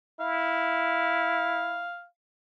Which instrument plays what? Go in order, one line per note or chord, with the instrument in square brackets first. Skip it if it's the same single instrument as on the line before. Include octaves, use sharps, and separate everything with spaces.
[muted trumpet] E4 [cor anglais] F5